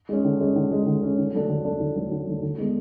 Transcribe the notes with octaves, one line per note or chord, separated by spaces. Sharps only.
G#3 C#4
D3
G#3 C#4
D3
G#3 C#4
D3
G#3 C#4
D3
F#3 A3 D4
D3
F#3 A3 D4
D3
F#3 A3 D4
D3
F#3 A3 D4
D3
G#3 B3